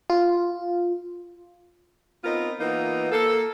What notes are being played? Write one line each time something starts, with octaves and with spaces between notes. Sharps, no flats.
F4
B3 C4 D#4 F4 A#4
E3 A#3 B3 D#4 F4
A#3 A4